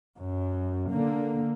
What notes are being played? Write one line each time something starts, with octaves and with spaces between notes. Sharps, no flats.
F#2
D3 A#3